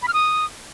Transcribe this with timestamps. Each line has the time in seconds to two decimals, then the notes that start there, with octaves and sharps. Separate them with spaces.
0.02 B5
0.08 F6
0.14 D#6